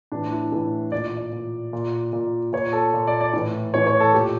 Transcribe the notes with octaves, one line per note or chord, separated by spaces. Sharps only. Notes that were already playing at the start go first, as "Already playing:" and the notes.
A2 E3 D4
E4
A2 E3
A#2 D5
D5
A#2
A#2
A#2
A#2 C#5
A4
A#2
D5
D5
A2 E3
A2 E3 C#5
C#5
A4
A#2 G4